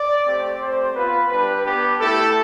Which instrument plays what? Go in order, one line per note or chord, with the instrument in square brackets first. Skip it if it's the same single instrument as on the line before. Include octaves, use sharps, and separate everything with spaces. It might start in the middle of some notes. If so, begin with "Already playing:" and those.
Already playing: [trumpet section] D5
A3 C4 G4
A3 C4 G4 C5
B3 F4 B4
G3 D4 G4 B4
B3 D4 G4
A3 E4 G4 A4